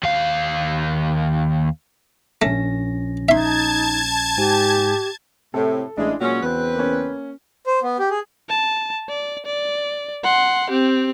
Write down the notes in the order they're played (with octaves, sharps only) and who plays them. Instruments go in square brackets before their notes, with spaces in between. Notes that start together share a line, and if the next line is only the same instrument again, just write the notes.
[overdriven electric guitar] D#2 F5
[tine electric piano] A#1 C#4 A#6 [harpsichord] A3
[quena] D#4 [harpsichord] E5 C6 [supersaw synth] A5 G#6
[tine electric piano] G#2 G#5 [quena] G4
[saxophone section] A2 [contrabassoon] C3 [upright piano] A4
[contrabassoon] A1 [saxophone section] G#3 [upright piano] D4 E4
[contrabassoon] A#2 [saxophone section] F#3 G#3 C#4 [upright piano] F#4
[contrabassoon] E2 [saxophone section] C#3 C4 B4
[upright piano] A#3 C#4
[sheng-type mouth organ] C5
B3
G4
G#4
[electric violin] A5
D5
D5
F#5 C6
C4 G4